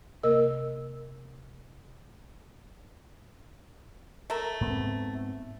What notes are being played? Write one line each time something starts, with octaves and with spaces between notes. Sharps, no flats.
C3 A#3 A#4 D#5 E6
A3 A#4 E5
G#2 B3 C4